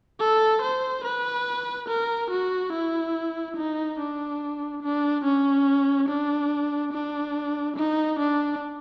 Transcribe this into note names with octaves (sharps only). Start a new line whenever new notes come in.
A4
C5
B4
A#4
F#4
E4
D#4
D4
D4
C#4
D4
D4
D#4
D4